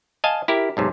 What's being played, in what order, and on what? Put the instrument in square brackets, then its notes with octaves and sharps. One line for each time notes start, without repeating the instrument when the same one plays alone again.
[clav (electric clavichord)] D#5 F5 G#5 A5
E4 G4 A#4
B1 G#2 C3